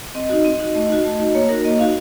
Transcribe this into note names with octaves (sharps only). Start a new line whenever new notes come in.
C4 D#5
D#4 F#4
C4
D#4 F#4
A3 D#5
D#4 F#4
A3
D#4 F#4
A#3 C#5
D#4 F#4 A#4
A#3 D#5
D#4 F#4 F5